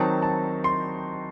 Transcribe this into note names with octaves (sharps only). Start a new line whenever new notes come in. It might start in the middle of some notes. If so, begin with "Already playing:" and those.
Already playing: D#3 F#3 C4 D#4 A5
A5
C6